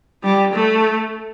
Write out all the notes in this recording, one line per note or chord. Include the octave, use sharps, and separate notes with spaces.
G3
A3